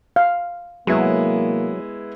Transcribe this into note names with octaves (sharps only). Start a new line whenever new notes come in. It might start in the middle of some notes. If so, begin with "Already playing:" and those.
F5
C3 E3 F#3 G#3 A#3 B3 E4